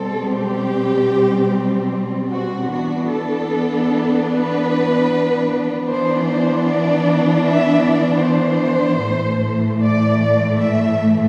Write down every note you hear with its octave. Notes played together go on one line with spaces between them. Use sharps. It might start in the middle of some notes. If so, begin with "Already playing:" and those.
Already playing: B2 G3 C4 A4
G4
F#4
E3 B3 D4 F#4
A4
B4
E3 B3 D4 C5
C5
D5
E5
D5
C5
A2 E3 A3
D5
D5
E5